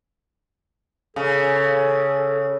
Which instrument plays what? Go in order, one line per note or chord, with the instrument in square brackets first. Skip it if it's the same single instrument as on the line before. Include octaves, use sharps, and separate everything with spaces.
[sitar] C#3 [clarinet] A4